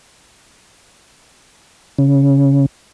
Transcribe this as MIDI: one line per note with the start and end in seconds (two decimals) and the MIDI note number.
1.98 2.66 49